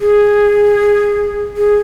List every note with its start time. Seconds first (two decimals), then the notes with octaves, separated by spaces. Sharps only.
0.01 G#4
1.57 G#4